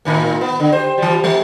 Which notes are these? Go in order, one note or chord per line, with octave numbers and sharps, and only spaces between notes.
A2 D#3 A#3
B3
D3
G4 C5
E3 G3
G3